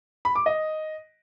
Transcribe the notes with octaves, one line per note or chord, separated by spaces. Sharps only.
B5
D6
D#5